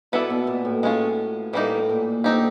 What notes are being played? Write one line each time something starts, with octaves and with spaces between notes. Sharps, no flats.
B2 B3 E4 A4 D5
B2
A#2
A2
G#3 C#4 F4
A2 E3 G3 A#3 D#4
A#2
D3 C4 D#4 G4